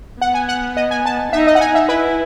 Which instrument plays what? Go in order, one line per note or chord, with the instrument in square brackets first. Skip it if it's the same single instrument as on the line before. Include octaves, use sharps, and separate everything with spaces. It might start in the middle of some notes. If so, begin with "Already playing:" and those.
[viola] B3 [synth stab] F#5
[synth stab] G#5
F#5
D#5
G#5
A5
[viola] D#4 [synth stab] E5
[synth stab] D#5
F#5
[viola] D#4 [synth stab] G#5
[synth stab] E5
[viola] E4 [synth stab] B4